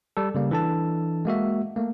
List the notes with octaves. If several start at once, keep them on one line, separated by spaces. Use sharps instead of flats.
G3 A4
C#3 G3 A#3
E3 D4 A4 A5
G#3 A#3 F#4 E5
A3 A#3